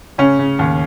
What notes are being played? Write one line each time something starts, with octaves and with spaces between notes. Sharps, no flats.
C#3 C#4
C#3
D#2